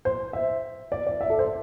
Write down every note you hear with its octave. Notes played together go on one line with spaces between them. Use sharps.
C5
E5
D5
D5
E5
A4
C5